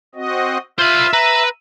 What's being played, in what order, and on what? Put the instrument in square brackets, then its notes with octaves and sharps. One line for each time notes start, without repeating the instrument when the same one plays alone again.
[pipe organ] C4 F#4 D#5
[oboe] F4 [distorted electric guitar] C5 B5 [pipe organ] E5
[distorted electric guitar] B4 [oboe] A#5